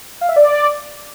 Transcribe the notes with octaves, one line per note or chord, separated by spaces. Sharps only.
F5
E5
D5